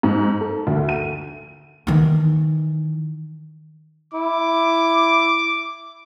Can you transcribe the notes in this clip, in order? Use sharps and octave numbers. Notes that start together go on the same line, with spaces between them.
G#2
A4
D2
D#7
D#3 E3
E4 D6